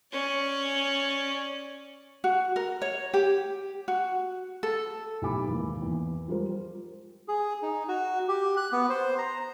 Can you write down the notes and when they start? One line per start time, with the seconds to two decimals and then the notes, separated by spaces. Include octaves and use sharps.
0.12 C#4 D5
2.24 F#4
2.56 A#4
2.82 C#5
3.14 G4
3.88 F#4
4.63 A4
5.22 B1 A2 G4 G#5 B5 D6
5.48 D#2 G#2 E3 A#3
5.82 E2
6.28 F3 G3 G#3 F4 A#4 C5
7.28 G#4
7.62 D#4
7.88 F#4
8.28 G4
8.57 F#6
8.72 B3
8.90 C5
9.18 A#5